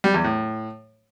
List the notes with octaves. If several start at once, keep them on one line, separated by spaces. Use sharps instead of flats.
G3
E2
A2